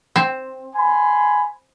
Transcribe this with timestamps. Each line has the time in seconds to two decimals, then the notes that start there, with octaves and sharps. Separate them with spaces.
0.16 C4
0.75 G#5 B5 C6